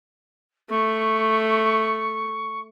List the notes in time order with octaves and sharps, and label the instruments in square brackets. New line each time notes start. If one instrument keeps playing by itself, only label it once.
[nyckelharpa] A3 [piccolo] C#6